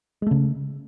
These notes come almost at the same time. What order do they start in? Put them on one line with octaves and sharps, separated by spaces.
G#3 A3 C#3